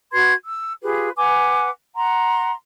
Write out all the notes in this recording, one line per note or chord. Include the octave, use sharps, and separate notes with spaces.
F#4 B4 C6 G#6
E6
F4 G4 G#4 B4
B4 F#5 G#5 D6
F#5 A#5 C6